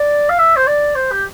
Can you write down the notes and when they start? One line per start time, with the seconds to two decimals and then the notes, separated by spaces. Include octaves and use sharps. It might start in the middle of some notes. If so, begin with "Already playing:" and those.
Already playing: D5
0.29 F5
0.39 E5
0.56 C5
0.67 D5
0.95 C5
1.12 G4